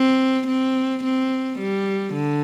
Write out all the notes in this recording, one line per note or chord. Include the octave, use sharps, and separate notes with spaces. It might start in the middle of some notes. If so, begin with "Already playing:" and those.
Already playing: C4
C4
C4
G3
D3